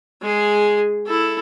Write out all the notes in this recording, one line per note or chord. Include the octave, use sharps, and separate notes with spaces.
G#3 G#4
E4 A4